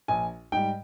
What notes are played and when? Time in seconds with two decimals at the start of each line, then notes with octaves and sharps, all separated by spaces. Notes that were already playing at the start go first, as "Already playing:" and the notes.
0.08 A#1 G#5
0.52 G#2 G3 G5